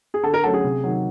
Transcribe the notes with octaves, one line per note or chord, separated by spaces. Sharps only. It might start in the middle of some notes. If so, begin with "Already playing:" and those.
G#4
D3 A4
A#4
F#3 A3 C#4 A4
G#4
C3
D#3 F#3